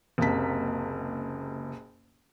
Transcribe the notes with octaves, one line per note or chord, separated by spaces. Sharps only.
F#1 C#2 C3 A#3 A5 B6